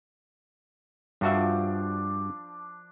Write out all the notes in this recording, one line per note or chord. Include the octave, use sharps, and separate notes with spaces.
G2 F3 D4 F#4 E5